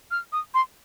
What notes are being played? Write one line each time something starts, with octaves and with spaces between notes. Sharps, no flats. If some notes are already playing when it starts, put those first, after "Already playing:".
F6
D#6
C6